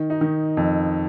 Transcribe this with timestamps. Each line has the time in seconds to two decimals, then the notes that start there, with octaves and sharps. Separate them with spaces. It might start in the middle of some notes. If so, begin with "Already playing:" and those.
Already playing: D#3
0.10 D#4
0.21 D#3
0.57 F2